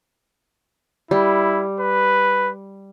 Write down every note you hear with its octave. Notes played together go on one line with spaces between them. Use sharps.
G3 E4
B4